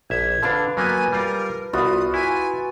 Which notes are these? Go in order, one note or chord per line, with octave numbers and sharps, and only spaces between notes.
A#1 E5 G#6
D3 D4 B4 F5 A5
F#3 A#3 B3 G#5
G3 F4 A#4
C2 B3 F4 F#4 D#6
E4 G#5